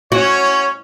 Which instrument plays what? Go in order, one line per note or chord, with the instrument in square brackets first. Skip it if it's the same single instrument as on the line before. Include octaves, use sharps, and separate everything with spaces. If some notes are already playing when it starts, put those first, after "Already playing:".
[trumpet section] C#4 C#5 [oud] F#4